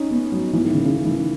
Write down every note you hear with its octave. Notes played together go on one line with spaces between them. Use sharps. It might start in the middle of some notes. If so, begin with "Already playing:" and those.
Already playing: C#4 D#4
B3
F#3
E3
D#3
C#3
C#3
D#3
E3
D#3